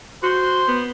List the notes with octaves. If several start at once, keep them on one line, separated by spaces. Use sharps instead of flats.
F#4 C5
B3